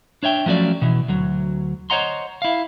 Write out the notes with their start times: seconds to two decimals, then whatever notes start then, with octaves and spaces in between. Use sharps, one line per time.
0.23 D4 C#5 E5 G5
0.46 F3 F#3 A3 C#4 D5
0.82 B2 E3
1.08 D2 F#3
1.90 C5 C#5 D#5 F#5 A#5 C6
2.42 E4 F5